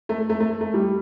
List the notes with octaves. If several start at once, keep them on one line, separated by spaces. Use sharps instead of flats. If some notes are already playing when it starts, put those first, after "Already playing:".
A3
A3
A3
A3
G3